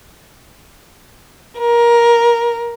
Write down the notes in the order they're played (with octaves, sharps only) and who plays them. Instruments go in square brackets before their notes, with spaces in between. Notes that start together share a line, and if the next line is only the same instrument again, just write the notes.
[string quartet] A#4